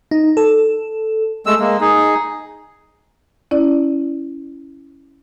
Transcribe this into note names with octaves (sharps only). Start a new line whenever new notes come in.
D#4
A4
G#3 A3 E6
G#3 A#3
D#4 G#4
C#4 E4 D5